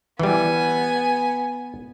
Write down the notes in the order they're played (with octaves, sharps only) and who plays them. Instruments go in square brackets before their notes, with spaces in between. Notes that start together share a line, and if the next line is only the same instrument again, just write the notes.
[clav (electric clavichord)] E3 G3 [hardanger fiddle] B3 G#5